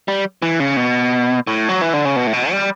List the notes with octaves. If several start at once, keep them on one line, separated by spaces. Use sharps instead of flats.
G3
E3
C#3
B2
A2
F#3
E3
D3
C#3
B2
A2
B2
G3